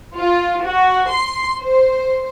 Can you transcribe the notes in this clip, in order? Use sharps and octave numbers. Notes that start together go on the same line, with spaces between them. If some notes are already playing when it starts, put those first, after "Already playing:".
F4
F#4
C6
C5